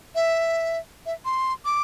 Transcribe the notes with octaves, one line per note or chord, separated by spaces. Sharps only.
E5
E5
C6
D6